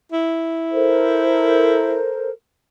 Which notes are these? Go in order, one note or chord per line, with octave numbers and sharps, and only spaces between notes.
E4
A4 A#4 C5